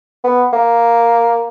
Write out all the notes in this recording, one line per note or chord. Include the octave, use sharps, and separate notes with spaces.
B3
A#3